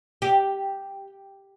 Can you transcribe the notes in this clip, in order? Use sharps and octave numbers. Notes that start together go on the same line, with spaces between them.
G4